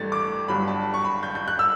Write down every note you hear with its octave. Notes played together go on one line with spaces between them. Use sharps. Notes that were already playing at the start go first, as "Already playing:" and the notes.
Already playing: A1 G2 A3 A6
D6
G1 G2 F#3 B5
A5
C#6
B5
G6
G6
F#6
E6